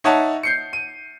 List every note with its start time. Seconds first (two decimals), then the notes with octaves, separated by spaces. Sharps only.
0.04 D#4 C#5 E5 F#5 A5
0.43 G6 C7 C#7
0.73 D#7